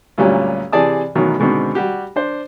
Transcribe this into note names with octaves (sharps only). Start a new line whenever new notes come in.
D2 G2 A#2 F#3 G3 C#4
C3 E3 G#4 D5 A5 D#6
A1 B2 D#3 F#3
G#2 B2 D3 D#3 C4
G3 F#4 G4
D4 C5